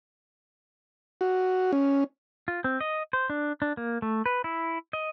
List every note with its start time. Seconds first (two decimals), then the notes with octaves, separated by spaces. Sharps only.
1.21 F#4
1.73 C#4
2.48 F4
2.64 C4
2.81 D#5
3.13 C5
3.30 D4
3.62 D4
3.77 A#3
4.02 A3
4.26 B4
4.44 E4
4.93 D#5